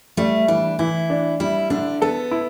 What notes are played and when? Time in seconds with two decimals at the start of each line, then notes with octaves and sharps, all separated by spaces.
0.17 G3 A3
0.48 E3 D4
0.79 E3 E4
1.10 D4
1.40 G3 E4
1.70 D3 D4
2.02 B3 A4
2.31 E4